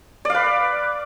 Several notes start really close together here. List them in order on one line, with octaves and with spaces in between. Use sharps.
D5 F5 B4